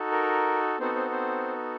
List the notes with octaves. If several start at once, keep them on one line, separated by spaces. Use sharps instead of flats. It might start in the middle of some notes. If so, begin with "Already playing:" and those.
Already playing: D#4 F#4 A4
A#4
B3 C4 D#4 F#4 A4 C5
C4 C5
C4 C5